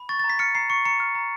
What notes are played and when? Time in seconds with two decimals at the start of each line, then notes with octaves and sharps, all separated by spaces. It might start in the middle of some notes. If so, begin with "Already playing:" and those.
Already playing: B5
0.09 C#6 A6
0.19 A6
0.24 A#5
0.29 B6
0.39 F6 C#7
0.55 A#5 C7
0.70 C#6 C#7
0.85 A#5 C#7
1.00 F6
1.15 A#5